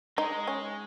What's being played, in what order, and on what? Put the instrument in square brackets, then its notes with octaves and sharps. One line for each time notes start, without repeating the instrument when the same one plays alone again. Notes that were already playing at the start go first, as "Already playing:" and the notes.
[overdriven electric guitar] G#3 [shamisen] D#4
[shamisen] C#4